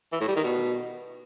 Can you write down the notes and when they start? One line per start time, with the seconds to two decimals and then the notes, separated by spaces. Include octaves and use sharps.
0.13 E3
0.20 A2
0.28 G3
0.36 D#3
0.44 B2